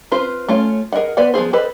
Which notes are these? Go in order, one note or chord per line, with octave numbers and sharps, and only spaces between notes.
C4 F4 B4 C5
A3 C#4 F4 C#5
G#4 A#4 D5 D#5 F#5
B3 B4 C5 D5 F#5
F3 B3 G#4 C5
G#4 A4 B4 C5 D#5